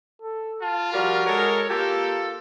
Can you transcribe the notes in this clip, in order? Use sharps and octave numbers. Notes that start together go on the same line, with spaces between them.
A4
F4 A5
F3 G3 F#4 A#4
G#3 A4 A#4 C#5
A#3 F4 G4 A4